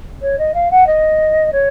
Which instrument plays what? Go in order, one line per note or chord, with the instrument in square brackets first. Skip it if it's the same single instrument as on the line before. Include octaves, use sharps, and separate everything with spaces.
[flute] C#5
D#5
F5
F#5
D#5
C#5